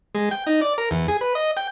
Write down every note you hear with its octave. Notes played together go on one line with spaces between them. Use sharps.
G#3
G5
D#4
D5
A#4
E2
G#4
B4
D#5
G5